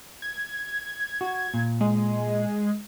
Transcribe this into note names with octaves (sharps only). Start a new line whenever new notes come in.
G#6
F#4
A#2
G#3